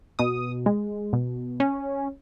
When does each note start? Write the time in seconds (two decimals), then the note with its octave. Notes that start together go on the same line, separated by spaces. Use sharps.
0.19 B2 D#6
0.66 G#3
1.13 B2
1.60 C#4